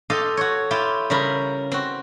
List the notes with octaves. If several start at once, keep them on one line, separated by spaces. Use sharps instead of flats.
F4 G4 A4 D#5 F5
F#4 C#5
E4 F4 G4
C#3 G3 A#4 B5
C4 F#4